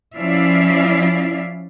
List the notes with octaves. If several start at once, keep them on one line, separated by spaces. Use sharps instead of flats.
F3 C#4 E4 D5 E5 F5